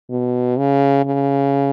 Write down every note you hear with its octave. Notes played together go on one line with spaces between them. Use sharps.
B2
C#3
C#3